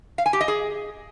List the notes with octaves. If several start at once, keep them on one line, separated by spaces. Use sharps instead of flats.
F5
G#5
G4
D#5
G#4